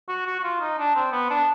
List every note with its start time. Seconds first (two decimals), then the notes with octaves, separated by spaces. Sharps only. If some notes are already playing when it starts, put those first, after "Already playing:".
0.09 F#4
0.27 F#4
0.40 F#4
0.44 F4
0.61 D#4
0.79 D4
0.95 C4
1.12 B3
1.30 D4